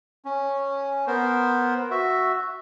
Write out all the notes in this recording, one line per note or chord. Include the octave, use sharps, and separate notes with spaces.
C#4
B3 A#4 C5
F#4 E5